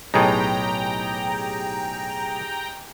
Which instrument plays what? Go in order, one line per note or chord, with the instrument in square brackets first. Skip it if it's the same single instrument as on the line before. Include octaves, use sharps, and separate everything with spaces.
[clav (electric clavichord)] B1 A2 [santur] D#4 G4 G#4 [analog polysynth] G5 A#5